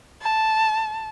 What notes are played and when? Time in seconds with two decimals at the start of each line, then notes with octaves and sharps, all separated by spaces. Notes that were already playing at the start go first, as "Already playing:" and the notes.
0.22 A5